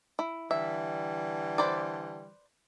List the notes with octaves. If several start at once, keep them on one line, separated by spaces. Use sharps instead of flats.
E4
D3 E3 G3 E5
B4 C5 D5